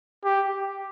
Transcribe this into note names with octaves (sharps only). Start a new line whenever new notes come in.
G4